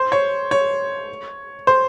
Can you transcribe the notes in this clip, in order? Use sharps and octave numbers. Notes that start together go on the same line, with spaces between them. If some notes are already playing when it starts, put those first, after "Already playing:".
Already playing: C5
C#5
C#5
C5